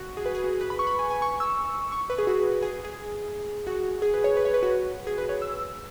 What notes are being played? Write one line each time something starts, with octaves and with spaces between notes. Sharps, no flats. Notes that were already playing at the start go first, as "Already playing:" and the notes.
Already playing: F#4
G#4
B4
G#4
F#4
G#4
B4
B5
C#6
B5
G#5
G#5
C#6
E6
C#6
B4
G#4
F#4
G#4
G#4
G#4
F#4
G#4
B4
C#5
B4
C#5
B4
F#4
G#4
B4
C#5
E6